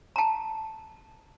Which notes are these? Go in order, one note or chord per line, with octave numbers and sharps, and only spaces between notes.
A5 A#5